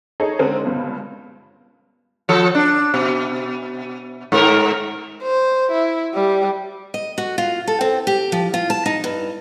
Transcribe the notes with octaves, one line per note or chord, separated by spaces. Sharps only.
D#4 G#4 A4 C#5 D#5
D3 G#3 C4 C#4 A#4
C#2 G2 B2
F3 A4
D4
B2
G#2 A#4
C5
E4
G3
D#5
F#4
F4
A4
C4
G4
F3
F4
A5
D#4
G2